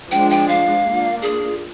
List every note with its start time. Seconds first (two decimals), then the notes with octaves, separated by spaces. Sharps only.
0.11 F3 G#3 D4 G5
0.30 G5
0.48 F5
0.85 A#3 D4 F4
1.22 G#4